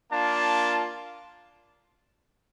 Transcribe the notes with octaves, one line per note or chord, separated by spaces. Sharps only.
A#3 D4 F4 A5